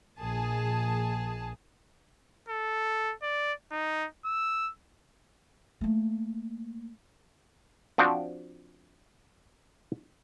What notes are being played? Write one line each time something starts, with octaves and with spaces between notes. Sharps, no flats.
A#1 G#4 A5
A4
D5
D#4
E6
A3 A#3
F3 C4 D4 F#4 G5